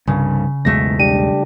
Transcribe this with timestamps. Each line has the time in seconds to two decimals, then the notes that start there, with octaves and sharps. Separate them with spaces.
0.07 C2 G2 C#3
0.65 B1 E2 G#3 A3 A#6
0.99 G3 D4 G4 D#7